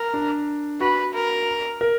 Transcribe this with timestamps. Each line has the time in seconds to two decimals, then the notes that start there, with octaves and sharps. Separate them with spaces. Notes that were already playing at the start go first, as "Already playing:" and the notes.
Already playing: A#4
0.14 D4
0.80 F#4 B4
1.14 A#4
1.81 A#4